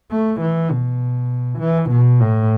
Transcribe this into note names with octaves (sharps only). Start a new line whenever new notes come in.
A3
E3
B2
E3
B2
A2